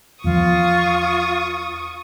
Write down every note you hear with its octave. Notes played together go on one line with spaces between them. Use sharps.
E2 F3 F4 C#6 D#6